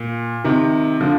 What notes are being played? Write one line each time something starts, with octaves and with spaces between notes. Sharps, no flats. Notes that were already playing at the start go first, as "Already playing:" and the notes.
Already playing: A#2
C3 D#3
D3 F3